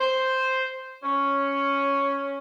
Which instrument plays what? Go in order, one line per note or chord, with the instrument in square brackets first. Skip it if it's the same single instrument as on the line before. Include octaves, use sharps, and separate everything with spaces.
[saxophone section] C5
C#4